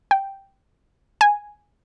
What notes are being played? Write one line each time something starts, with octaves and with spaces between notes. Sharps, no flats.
G5
G#5